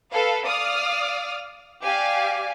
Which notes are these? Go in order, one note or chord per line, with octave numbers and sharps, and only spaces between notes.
A4 B4 F5
D5 F5 D#6 F6
G4 D5 F5 G#5